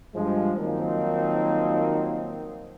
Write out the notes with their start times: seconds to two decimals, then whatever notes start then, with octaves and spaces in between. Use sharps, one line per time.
0.14 G2 F3 G#3
0.55 D#3 F3 F#3 A#3 C4 D#4